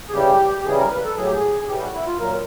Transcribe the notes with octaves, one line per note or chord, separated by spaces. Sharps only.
G#4
C#3 E3 G3 G4
G4
C#3 E3 G3 G#4
A#4
B4
A4
A2 F#3 G#4
G4
G#4
G#4
A2 E3 G3 G4
F#4
E4
F4
A#2 F#3 A#4